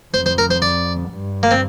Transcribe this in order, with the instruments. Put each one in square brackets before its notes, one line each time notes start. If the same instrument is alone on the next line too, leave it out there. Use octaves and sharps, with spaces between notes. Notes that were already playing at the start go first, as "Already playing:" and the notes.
[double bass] F2 [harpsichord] C5
[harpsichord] C5
A#4
C5
D5
[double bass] G2
[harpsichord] A#3
C4